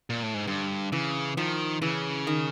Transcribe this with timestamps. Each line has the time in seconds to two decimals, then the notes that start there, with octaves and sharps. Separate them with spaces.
0.10 A#2
0.23 A2
0.34 G#2
0.47 G2 D3
0.92 C#3 E3
1.37 D#3 F3
1.82 C#3 E3
2.27 D#3